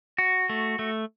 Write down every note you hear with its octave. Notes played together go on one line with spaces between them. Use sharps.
F#4
A3
A3